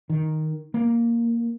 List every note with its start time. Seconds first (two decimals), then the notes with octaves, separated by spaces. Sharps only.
0.10 D#3
0.74 A#3